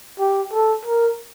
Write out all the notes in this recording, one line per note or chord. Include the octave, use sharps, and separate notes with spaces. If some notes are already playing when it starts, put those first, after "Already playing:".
G4
A4
A#4